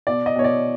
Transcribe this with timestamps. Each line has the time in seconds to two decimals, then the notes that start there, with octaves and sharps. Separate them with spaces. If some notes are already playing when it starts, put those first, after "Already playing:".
0.07 B2 D5
0.26 D#5
0.36 B2 C#5
0.44 D5